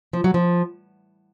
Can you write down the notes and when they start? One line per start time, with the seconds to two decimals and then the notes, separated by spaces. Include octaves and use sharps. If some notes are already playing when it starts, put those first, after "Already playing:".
0.13 F3
0.24 F#3
0.34 F3